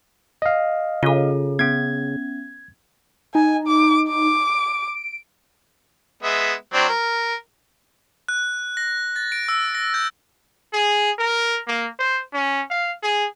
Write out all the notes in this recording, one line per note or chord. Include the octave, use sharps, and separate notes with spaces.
D#5 F5
C#3 F4 A4
B3 C#4 G#6
D#4 G#5
D6
D6
D7
G#3 B3 E5
F#3 C4 D4
A#4
F#6
A#6
A6
D7
E6
A#6
G6
G#4
A#4
A#3
C5
C#4
F5
G#4